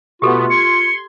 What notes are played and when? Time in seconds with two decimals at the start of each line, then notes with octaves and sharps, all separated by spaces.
0.22 B2 A3 B3 F4 G4 A4
0.50 C6 G#6 C#7